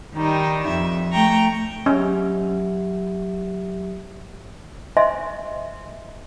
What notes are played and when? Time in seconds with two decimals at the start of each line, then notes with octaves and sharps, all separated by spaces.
0.15 D#3 G3 D#4
0.68 F2 E5
1.11 A3 G5 A#5 C#6
1.86 F#3 C#4 G4 E5
4.97 C5 D#5 E5 G#5 C6